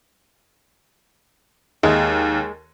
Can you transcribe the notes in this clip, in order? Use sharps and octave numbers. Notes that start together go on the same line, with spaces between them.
D#2 G#3